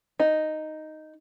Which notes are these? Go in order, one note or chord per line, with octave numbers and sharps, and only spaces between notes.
D#4